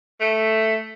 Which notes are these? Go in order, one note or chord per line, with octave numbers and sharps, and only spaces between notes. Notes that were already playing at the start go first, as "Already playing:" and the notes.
A3